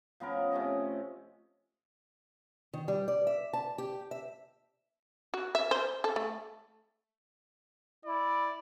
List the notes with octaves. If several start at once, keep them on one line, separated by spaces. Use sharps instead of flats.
F3 B3 C#4 A#4
C3 A3 C#4 D#5
D#3
G3
D5
E5
A5
G4
E5
F#4
E5
C5
A4
A3
E4 D5